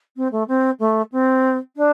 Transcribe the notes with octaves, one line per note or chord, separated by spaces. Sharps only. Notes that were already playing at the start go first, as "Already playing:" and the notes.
C4
A3
C4
A3
C4
D4